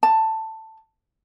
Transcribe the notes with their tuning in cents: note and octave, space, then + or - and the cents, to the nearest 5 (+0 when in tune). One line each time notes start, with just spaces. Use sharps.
A5 +10